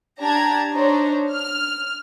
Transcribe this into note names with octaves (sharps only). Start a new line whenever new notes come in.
D4 G4 A5 A#5 G#6
D4 D#4 C5 C#5 A#5
F6